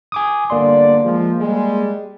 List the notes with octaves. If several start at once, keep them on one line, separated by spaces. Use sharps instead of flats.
G#5 D6 D#6
G1 D3 A#3 D5 C6
F3 G#3
G3 G#3